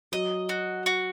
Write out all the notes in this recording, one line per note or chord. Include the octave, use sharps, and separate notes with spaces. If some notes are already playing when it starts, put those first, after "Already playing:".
F#3 D#5
F#4
F#4